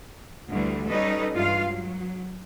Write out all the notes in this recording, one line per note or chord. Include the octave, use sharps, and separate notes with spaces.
D2 D3 E3 G3 A3
G3 C#4 D#4 A4 B4 D#5
G2 E3 G#3 F4 F5
F#3